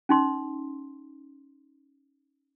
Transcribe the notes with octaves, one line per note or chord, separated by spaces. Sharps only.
C#4 D#4 C6